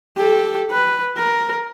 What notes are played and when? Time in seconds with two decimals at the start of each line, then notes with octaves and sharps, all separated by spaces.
0.17 G4 A4
0.71 B4
1.17 A#4